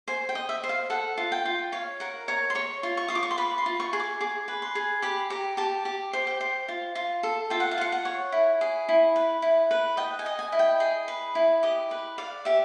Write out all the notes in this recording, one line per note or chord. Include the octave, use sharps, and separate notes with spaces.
C5 G#5
G5
D#5
E5
C5
F5
A4 F#5
F4
G5
F4
C#5 F5
A#4 F#5
C#5 A#5
C6
C#5 C#6
F4
C#6
F4 D#6
D6
C#6
C6
B4 B5
C6
F4
C#6
G#4
D6
G#4 D6
B4
C6
G#4
G4 B5
G4 A#5
G4 A5
G4
C5
G5
C5
F4
F4
A4
F4 G5
F#5
F5
F4 F#5
F#5
C#5
E4
G#4
E4
B4
E4
B4
D#5 G5
G#5
D#5
G#5
E4
G5
G#4
B4
E4
G4 D#5
B4
D5 F5
G4 E5